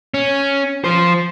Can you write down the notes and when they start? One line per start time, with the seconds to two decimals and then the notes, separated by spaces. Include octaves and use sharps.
0.14 C#4
0.84 F3 C5